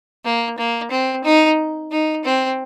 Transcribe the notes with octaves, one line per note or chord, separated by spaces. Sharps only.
A#3
A#3
C4
D#4
D#4
C4